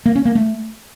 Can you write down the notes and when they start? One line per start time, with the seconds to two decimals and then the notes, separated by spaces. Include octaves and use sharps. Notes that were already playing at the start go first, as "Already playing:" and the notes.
0.06 A#3
0.15 C#4
0.25 A#3
0.35 A3